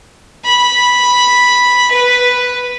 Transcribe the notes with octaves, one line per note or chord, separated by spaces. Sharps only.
B5
B4